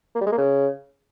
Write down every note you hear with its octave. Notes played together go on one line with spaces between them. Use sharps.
A#3
G3
G#3
A#3
C#3